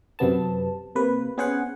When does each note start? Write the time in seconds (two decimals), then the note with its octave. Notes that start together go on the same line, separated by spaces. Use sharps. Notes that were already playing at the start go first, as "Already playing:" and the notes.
0.19 F#2 C3 B3 A5
0.95 C3 A#3 B4
1.38 B3 C#4 G#4 C5 C#5 F#5